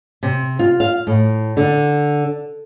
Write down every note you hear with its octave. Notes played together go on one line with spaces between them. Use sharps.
C3
F4
F5
A2
D3